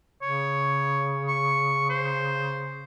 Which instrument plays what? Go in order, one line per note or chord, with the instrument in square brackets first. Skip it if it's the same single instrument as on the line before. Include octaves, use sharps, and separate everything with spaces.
[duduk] C#3 [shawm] C#5
[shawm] C#6
C5